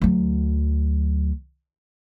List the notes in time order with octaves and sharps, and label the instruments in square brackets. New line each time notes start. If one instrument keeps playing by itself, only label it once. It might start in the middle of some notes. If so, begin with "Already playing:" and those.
[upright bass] D2 F#3